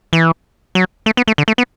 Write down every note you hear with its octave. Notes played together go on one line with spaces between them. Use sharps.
E3
F#3
A3
B3
A3
D3
A3
B3